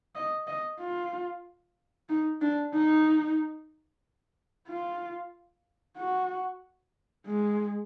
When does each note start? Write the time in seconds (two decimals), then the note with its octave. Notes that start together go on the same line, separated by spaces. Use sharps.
0.15 D#5
0.47 D#5
0.80 F4
2.09 D#4
2.41 D4
2.74 D#4
4.67 F4
5.97 F#4
7.26 G#3